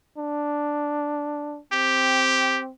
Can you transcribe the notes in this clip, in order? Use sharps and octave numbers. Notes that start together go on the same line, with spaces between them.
D4
C4 G4